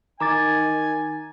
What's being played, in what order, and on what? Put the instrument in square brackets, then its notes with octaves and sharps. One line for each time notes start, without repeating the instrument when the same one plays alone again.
[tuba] D#3 [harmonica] G#5 [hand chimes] A#5 D6 A6